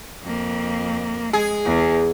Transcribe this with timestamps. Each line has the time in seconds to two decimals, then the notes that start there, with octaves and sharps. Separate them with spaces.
0.23 F2 A#3
1.33 G#3 G#4
1.66 E2